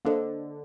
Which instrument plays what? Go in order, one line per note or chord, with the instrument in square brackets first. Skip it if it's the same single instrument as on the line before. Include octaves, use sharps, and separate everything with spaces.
[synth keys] D3 [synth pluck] A#3 D4 A4 C5 D#5